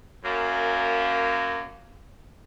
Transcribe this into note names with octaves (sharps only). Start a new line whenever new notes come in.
F#2 A#3